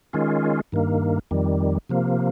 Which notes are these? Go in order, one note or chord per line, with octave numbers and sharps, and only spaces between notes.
D#3 G#3 C#4 F4
G2 D#3 A#3
F2 D#3 G3
C3 F3 A#3